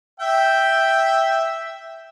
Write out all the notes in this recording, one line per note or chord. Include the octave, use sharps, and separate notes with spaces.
E5 G5